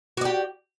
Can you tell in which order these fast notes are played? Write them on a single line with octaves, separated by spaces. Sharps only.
F#4 D5 G4